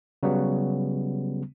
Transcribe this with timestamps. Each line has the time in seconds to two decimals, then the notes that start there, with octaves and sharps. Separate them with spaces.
0.23 C#3 F#3 G3 B3